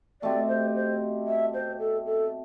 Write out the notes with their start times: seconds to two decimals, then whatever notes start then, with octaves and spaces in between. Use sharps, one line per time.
0.22 B2 A3 C4 G4 D5
0.48 C5
0.75 C5
1.27 E5
1.54 C5
1.79 A4
2.06 A4